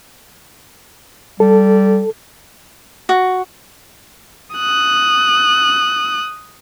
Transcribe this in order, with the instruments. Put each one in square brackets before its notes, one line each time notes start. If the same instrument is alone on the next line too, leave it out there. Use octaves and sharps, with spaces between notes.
[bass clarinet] G3 [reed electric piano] A4
[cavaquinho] F#4
[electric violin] D#6 F#6